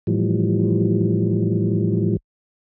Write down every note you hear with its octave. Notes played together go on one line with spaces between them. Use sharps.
A2 E3 F3 G3